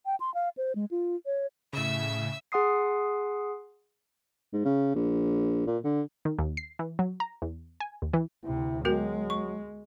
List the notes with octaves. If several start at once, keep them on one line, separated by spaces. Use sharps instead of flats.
G5
C6
F5
C5
G#3
F4
C#5
A2 C#3 E5 E6
G#4 F#5 C6 D#6 C7
G#2
C#3
A#1
A#2
D3
D#3
D#2
C7
E3
F#3
A#5
E2
G#5
D#2
E3
D2 C3 E4
F#3 G#3 B3 F#4 A#4
C#6